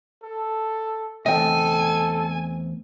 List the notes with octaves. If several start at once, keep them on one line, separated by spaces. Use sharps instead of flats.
A4
E2 A3 C4 A4 D#5 G5 G#5